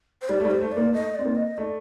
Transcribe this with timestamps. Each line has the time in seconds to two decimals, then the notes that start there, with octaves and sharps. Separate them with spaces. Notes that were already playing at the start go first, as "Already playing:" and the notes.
0.22 C5
0.29 G3 D5
0.40 A3
0.45 G3
0.51 C5
0.61 A3
0.72 A#3 D5
0.93 A3 D#5
1.15 C4 D5
1.26 A#3
1.36 D#5
1.57 A3 D5